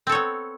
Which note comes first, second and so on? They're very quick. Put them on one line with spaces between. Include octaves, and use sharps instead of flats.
C4 A4 C#5 B3